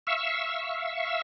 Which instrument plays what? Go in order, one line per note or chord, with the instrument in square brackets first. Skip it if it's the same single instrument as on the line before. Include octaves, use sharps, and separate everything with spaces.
[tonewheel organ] E5 F5 C#6 E6